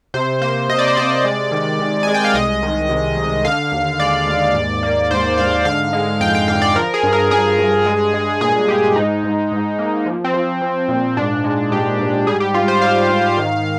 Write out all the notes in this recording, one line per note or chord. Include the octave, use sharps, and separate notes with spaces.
C3 C5
A#3 C5
C3 D#5
D5
C5
C3 D5
G#3
D#3
D#3
G#3 G#5
G5
F5
C2 D#5
D#3
C3
C2
D3 F5
D#2
G#3 D5
D#2
G#2
A#3
G#2 C5
G#2 F5
D3 F5
G#3
F2 G5
G5
D3 F5
D5
F3 A#4
G#4
G2
A#4
G2 G#4
G2
G#3
G#3
A#2 G#4
G#3 G4
G#2 D#4
G#2
G#2
A#3
F3
C4
F3
F3
A#2
G#2 D4
G#3
G#2 G4
G#2
G3 G#4
G4
G#2 F4
C5
G3 F5
G#2
D#3